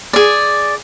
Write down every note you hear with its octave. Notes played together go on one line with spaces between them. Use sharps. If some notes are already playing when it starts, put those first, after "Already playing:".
G#4 D5